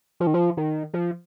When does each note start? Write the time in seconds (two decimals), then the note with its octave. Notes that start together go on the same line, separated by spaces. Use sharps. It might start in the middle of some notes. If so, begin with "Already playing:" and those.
0.20 F3
0.27 D#3
0.34 F3
0.57 D#3
0.94 F3